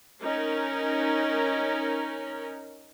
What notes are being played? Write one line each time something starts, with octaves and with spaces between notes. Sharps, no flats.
C#4 D#4 A#4